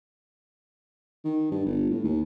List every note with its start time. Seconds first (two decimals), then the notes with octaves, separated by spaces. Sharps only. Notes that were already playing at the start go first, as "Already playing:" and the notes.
1.25 D#3
1.51 G2
1.66 G1
1.90 A2
2.04 D#2